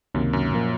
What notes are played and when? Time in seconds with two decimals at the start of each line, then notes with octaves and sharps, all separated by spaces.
0.14 C#2 F#2 C3 D#3 A#3
0.33 F#2
0.52 A#2 F3 A#3